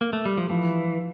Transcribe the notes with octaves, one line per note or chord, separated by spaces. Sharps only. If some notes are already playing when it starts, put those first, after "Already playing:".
A#3
A3
G3
F3
E3 F3